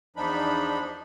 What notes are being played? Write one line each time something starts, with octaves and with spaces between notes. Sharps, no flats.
E2 F3 D4 D#4 B5